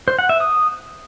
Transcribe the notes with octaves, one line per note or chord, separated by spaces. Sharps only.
C5
F#5
E5
D#6